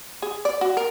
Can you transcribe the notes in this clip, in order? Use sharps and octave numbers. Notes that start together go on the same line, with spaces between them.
G#4
D5
F#4
A#4